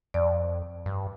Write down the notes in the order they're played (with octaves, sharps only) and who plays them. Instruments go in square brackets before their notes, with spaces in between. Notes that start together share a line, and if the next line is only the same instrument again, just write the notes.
[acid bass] F2 [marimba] D5
[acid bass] G2